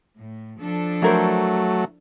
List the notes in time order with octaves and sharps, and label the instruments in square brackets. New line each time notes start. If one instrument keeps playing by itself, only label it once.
[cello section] A2
F3 D4 A4
[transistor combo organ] F#3 A3 [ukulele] E4 A#4 C5